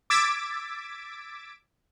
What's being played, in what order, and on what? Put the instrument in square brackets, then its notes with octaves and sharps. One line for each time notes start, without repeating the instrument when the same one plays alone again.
[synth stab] D6 E6 G#6 A6 B6 D7